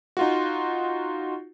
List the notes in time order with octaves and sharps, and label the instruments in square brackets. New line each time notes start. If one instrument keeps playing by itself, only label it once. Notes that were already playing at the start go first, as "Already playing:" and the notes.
[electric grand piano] D#4 F4 F#4